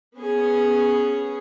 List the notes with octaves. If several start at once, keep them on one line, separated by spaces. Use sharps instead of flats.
B3 C#4 G#4